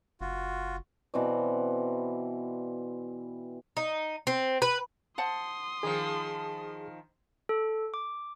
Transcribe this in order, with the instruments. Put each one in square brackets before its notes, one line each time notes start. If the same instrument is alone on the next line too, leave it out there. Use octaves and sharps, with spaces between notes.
[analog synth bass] F#1 [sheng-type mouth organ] F4 F#4
[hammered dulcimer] B2 E3 C4 D5
[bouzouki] D#4
C4
B4
[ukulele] C5 F#5 A5 [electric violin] C6 D#6
[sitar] D#3 F3 [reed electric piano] G#4
[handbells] A4
D6